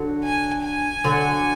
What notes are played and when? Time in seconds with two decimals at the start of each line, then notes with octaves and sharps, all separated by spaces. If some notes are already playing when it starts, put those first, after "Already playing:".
Already playing: D3 F#3
0.24 G#5
0.64 G#5
1.04 D3 F#3